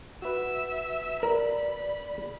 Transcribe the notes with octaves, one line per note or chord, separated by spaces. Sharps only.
F#4 B4 E5
A#4 D5 B5